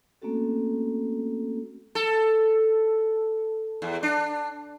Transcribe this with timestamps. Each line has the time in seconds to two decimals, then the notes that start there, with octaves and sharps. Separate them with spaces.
0.22 A3 A#3 C4 C#4 F#4 A4
1.95 A4
3.82 E2
4.03 D4